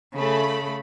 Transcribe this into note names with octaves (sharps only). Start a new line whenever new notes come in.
C#3 A3 B5